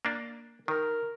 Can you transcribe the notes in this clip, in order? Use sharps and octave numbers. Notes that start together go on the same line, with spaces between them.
A#3 D4
D#3 A#4